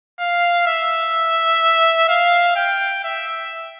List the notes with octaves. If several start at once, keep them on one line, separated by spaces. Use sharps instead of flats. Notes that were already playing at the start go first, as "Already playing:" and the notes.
F5
E5
F5
G5
E5